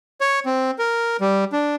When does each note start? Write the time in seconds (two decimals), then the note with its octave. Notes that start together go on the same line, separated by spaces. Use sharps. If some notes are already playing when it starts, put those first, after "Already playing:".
0.21 C#5
0.45 C4
0.79 A#4
1.21 G3
1.52 D4